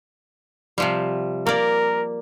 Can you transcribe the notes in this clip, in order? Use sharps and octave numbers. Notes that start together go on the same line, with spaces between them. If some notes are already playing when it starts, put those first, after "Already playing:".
C3 F3 G3
A#3 A#4 D5